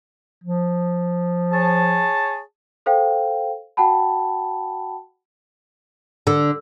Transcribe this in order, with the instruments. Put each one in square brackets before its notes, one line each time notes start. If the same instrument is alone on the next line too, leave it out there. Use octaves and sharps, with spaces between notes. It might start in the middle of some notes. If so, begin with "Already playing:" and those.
[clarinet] F3
[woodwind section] G#4 C#5 A5
[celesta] A4 C5 F5 G5
F#4 F#5 G5 A5 B5
[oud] D3